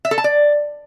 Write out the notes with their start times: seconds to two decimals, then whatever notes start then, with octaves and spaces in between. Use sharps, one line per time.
0.05 E5
0.11 A4
0.18 A5
0.24 D5